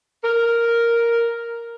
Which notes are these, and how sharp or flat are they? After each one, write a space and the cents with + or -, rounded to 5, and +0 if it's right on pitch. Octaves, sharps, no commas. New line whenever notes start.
A#4 +0